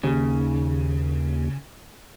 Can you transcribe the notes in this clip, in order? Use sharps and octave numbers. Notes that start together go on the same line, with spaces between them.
D#2 C#3